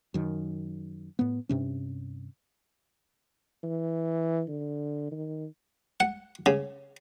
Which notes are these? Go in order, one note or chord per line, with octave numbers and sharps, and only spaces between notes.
F#2 D#3
A2 B3
G2 C3 C#4
E3
D3
D#3
F#5
C#3